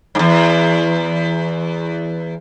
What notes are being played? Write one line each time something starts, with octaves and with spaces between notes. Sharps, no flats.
E2 G#2